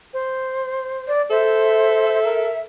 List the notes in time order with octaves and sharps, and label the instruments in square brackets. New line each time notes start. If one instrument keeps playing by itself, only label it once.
[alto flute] C5
[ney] D5
[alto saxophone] A4 [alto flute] C5 [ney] E5
[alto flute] A#4